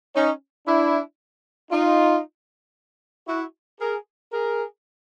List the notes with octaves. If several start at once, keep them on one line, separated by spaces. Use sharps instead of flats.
C#4 D#4
D4 E4
D#4 F4
E4 F#4
G#4 A#4
G#4 A#4